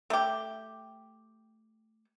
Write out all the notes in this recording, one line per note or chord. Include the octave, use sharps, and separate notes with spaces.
A3 G4